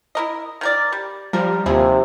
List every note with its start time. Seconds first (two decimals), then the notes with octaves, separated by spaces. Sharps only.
0.15 E4 A#4 D#5
0.61 D#3 A#4 D5
0.92 G3
1.33 F3 G3 A#4
1.66 D#2 C3 F3 E4 G#4